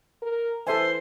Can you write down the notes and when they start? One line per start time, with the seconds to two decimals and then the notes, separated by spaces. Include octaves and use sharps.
0.22 A#4
0.67 E3 A4 C5 E5 G#5